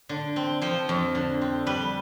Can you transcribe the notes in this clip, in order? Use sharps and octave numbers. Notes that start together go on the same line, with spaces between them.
D3
C4
F3 C5
F2
D3
C4
G3 B4